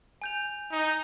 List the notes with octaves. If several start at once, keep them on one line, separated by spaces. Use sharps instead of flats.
G#5 G6 F7
D#4